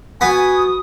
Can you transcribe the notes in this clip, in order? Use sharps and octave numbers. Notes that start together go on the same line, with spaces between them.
B3 F#4 G#5 C#6 D#6